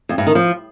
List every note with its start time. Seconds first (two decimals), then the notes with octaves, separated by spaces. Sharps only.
0.09 F2
0.18 G2
0.27 D#3
0.35 F3